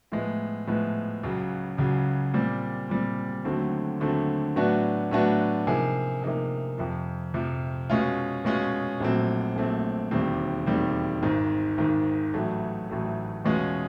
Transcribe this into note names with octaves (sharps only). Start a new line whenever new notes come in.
A2 F3 G#3 B3
A2 F3 G#3 B3
C#2 C#3 F#3
C#2 C#3 F#3
A#2 G3 C4
A#2 G3 C4
D#2 D3 F#3 A3 C4
D#2 D3 F#3 A3 C4
A2 F#3 B3 D4 F#4
A2 F#3 B3 D4 F#4
C3 F3 A#3 D#4 G#4
C3 F3 A#3 D#4 G#4
F2 C3 F3
F2 C3 F3
B2 G#3 C#4 F4
B2 G#3 C#4 F4
A#1 A#2 F#3 A3 C4
A#1 A#2 F#3 A3 C4
E1 D#2 D#3 G3 C4
E1 D#2 D#3 G3 C4
G#1 G#2 D#3
G#1 G#2 D#3
A1 A2 F#3 A3
A1 A2 F#3 A3
E2 B2 G#3 C#4 F4